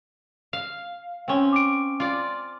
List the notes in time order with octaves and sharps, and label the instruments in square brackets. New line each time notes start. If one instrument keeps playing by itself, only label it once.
[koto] F5
C4 C#4
[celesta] D6 D7
[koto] F4 D5